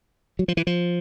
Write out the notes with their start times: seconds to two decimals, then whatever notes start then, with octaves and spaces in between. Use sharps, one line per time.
0.39 F#3
0.48 F3
0.57 E3
0.67 F3